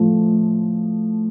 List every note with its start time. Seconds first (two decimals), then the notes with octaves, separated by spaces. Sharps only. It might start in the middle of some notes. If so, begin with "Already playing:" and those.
Already playing: A2 F3 A3